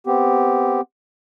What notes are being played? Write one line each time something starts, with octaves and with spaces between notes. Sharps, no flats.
B3 C4 G4